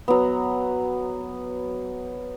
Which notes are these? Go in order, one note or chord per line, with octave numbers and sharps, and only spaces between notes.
F#3 B3